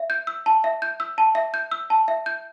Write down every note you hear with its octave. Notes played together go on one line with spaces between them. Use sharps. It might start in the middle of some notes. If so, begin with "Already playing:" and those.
Already playing: E5
G6
E6
A5
E5
G6
E6
A5
E5
G6
E6
A5
E5
G6